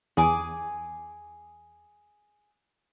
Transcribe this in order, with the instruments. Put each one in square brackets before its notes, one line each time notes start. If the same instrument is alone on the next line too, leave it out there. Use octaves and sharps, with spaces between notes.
[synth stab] E2 [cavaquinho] G#4 G#5 D6